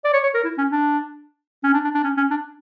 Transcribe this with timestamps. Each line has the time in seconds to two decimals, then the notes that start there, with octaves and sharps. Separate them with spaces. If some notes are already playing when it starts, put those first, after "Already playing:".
0.04 D5
0.13 C#5
0.23 C#5
0.34 A#4
0.44 E4
0.58 C#4
0.71 D4
1.64 C#4
1.74 D4
1.84 D4
1.94 D4
2.04 C#4
2.17 C#4
2.30 D4